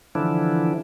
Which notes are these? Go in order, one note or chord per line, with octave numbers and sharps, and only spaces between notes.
D3 E3 F3 D4 E4